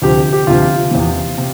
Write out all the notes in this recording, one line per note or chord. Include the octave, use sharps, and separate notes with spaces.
D2 C3 F3 G4
G4
D2 C3 F3 F4
E2 C3 E3
C3